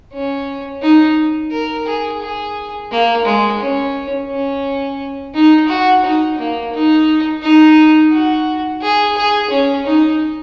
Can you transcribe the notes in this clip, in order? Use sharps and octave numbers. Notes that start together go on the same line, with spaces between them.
C#4
D#4
A#4
G#4
G#4
A#3
G#3
C#4
C#4
D#4
F#4
D#4
A#3
D#4
D#4
F#4
G#4
G#4
C#4
D#4